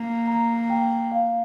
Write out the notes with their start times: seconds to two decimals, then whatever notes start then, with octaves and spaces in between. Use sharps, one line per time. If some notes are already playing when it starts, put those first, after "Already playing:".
Already playing: A#3
0.27 A#5
0.70 G5
1.12 F5